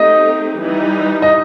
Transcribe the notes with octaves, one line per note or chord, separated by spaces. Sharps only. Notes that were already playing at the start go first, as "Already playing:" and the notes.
Already playing: A3 C4 D#4 G4 D#5
E3 G3 D#4
D#5